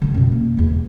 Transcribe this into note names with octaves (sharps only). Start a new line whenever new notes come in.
D3 D#3
F#2 B2
A#3
E2 E3
G2